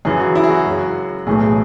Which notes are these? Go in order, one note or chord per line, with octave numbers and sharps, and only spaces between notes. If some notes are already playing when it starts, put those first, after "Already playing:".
F#2 C#3 E3 G#4
F#4
E4
G#4
F#4
F#2 C#3 G#3
B1 A2 E3 A3 G#4
G#4